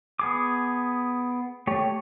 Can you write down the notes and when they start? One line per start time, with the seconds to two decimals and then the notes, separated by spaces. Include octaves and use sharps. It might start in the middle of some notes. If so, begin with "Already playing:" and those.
0.19 B3 G#4 D6
1.67 A3 G4 C#5